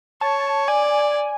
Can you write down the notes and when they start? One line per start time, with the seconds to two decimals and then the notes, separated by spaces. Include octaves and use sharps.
0.21 C#5 A5
0.68 D5 G#5